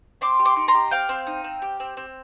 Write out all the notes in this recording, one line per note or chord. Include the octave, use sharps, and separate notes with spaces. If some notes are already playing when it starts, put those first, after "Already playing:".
C4 C6 D6
G4
C6 D6
D#4
A#5 C6
G4
C4 F5 G5
C4
D#4
C4
G4
C4
C4